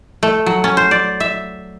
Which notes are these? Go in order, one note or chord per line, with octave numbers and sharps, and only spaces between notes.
A3
F#3
C#4
C5
D5
E5